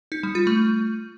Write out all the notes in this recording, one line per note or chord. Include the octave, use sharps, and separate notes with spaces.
D#4
G3
F4
A3